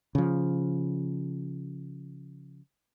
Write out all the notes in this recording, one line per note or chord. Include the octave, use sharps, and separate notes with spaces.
C#3 F3